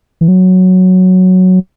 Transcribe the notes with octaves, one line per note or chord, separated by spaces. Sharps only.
E3
F#3